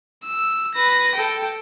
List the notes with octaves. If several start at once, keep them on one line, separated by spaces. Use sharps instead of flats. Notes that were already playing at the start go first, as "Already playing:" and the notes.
E6
B4 A#6
A4 G5